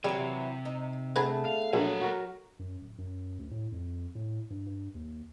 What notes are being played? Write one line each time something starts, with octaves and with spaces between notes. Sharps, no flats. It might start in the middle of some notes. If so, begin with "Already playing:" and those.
C3 E3 F#3 G3
D#4
A3 B3 D4 G#4 B4 G#5 A#5
F5
A#1 F#3 A#3 F#5
F#4 A#4
F#2
D1
F#2
D2
A2
F2
A2
G2
G2
D#2